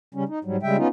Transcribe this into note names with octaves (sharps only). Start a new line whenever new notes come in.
C#3 G3 C#4
D#4
G#2 F#3 G3
C#3 G3 G#3 E5 G5
B3 C#4 D#4 F4